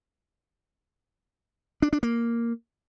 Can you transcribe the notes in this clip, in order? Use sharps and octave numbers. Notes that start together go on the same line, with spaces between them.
D4
D4
A#3